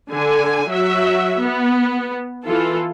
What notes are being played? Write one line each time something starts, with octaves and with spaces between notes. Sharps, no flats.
D3 G#5
F#3 F#4 E5
B3
E3 F4 A4